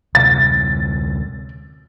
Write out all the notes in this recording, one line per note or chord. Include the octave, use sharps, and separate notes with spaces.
D2 C3 A6